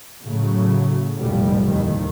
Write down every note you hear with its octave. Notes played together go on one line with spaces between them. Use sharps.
A2 C#3 F#3 A3
F1 A#1 A2 C3 F3 G3
D#2 A2 D#3